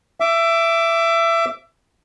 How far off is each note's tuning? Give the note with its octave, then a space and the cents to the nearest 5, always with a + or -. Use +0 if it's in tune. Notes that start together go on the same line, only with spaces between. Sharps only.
E5 +20 D6 -10